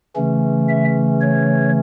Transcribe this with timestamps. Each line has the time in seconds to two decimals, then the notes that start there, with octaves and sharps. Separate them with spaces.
0.16 C#3 E3 A3 C#4
0.69 E5
1.21 C#5